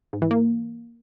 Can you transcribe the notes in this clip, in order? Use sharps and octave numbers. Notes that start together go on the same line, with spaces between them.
G#2
E3
A#3